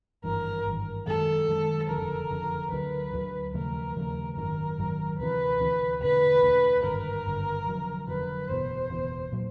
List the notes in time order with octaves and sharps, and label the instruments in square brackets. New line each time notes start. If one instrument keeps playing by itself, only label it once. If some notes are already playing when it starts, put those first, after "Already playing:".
[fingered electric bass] G#1 G2 E3 [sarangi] A#4
[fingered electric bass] G#1 G2 E3
[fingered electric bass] F#2 D#3 G#3 [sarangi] A4
[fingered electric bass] F#2 D#3 G#3
[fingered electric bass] F#1 F2 D3 F3 [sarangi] A#4
[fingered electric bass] F#1 F2 D3 F3
[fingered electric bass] D2 D3 F#3 [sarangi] B4
[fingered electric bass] D2 D3 F#3
[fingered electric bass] D#2 C#3 F3 A3 [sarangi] A#4
[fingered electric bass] D#2 C#3 F3 A3
[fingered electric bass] G#1 F#2 D#3 F#3 [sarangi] A#4
[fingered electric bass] G#1 F#2 D#3 F#3
[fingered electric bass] D2 C3 E3 [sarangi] B4
[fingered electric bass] D2 C3 E3
[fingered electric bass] E1 D2 D3 [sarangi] B4
[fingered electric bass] E1 D2 D3
[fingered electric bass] G#1 G2 D3 [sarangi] A#4
[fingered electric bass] G#1 G2 D3
F1 F2 D3 F#3
[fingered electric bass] F1 F2 D3 F#3 [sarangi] B4
[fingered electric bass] F#1 E2 B2 [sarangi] C5
[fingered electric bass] F#1 E2 B2
A#2 F#3